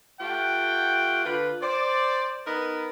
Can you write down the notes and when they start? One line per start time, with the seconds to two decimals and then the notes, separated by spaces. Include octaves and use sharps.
0.20 A3 F4 G4 F#5 G5
1.25 D3 F4 B4
1.61 C5 D5
2.46 B3 D#4 A#4 B4